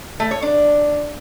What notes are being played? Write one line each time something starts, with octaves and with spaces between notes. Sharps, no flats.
A3
C#5
D4